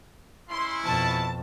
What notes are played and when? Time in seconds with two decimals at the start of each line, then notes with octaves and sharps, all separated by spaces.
0.50 G#3 C#4 E4 C6
0.83 F2 B2 A5